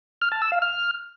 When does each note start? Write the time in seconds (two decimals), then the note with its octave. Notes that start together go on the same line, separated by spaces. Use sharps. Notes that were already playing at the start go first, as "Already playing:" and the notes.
0.22 F6
0.32 A5
0.42 E6
0.52 F5
0.62 F6